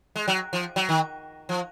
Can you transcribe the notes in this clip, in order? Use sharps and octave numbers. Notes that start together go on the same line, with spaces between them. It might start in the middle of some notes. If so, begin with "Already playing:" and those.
G#3
F#3
F3
F#3
D#3
F3